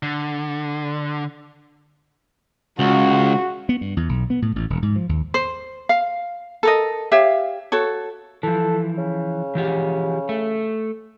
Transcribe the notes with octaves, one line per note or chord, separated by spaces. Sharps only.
D3
C#2 F#4
B3
G2
E2
B1
B3
A2
A1
E1
G#2
F3
D#2
C5
F5
A4 A#4 D#5
G4 C#5 E5 F5
F#4 A4 C#5
E3 F3 A4
C#3
E3 F3 G4
A3